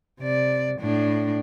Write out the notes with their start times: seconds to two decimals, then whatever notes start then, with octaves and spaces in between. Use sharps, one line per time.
0.21 C3 D5
0.80 A2 D4